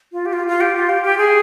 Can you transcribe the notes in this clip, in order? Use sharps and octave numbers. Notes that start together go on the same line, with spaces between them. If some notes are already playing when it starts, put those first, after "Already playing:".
F4
G4
F4
F4
G4
F4
G4
G4
G#4